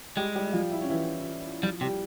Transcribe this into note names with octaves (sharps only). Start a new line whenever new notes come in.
G3 G#3 G4
G3 G4
F3 F4
E4
C#4
E3 E4
F3 G3 F4
C3 G3 G4